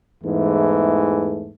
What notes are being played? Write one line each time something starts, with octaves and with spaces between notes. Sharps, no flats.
E2 G#2 E3 A3